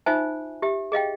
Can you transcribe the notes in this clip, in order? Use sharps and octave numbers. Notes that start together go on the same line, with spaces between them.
D#4 F4 C5 E5 G#5
G4 E5
G#4 D#5 F5 G5